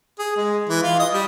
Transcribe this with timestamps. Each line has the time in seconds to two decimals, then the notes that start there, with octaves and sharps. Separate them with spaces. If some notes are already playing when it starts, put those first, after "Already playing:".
0.19 G#4
0.36 G#3
0.69 E3
0.83 F4
0.99 D#5
1.13 G3